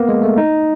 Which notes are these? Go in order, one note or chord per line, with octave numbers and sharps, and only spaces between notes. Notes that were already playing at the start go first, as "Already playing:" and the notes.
Already playing: A#3 B3
G#3
A3
D#4